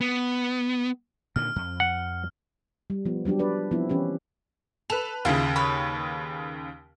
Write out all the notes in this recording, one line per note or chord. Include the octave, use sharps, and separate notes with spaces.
B3
A#2 D3 D#3 F6
F2
F#5
G3
F3 B3
F#3 G3 D4 G4
D4 B4 D5
F3 B3 C4 E4
E3 C#4 G4 B4
A4 B4 F7
D#2 C#3 E4 F4
B4 C#5 B5